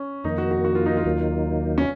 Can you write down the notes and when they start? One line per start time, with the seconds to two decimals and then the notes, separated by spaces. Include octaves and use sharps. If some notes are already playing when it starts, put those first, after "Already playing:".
Already playing: C#4
0.24 F2 D#3 A#3 D#4
0.38 F#4
0.51 F#4
0.65 F#4
0.75 F4
0.86 D#4
0.97 F4
1.05 D#2 D#3 F#3 A#3 D#4
1.78 C#4